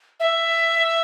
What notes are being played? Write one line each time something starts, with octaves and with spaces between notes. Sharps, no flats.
E5